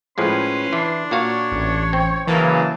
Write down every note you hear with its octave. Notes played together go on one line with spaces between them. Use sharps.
A2 F3 G#3 C#4 B4 C6
E3 D4
A#2 F#4 C#5 F5
A1
C4
C#3 E3 F#3 A#3 A5